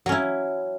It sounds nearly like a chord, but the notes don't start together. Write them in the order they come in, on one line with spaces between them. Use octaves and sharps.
F#3 C#4 E4